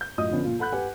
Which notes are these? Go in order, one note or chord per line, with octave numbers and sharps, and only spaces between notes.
G6
F#2 A2 F4 D#5 D#6
D3 F3 B3 C#4 D4
A#2 F4
A4 F#5 B5 F#6 G6
G4 B4 F#5 G#5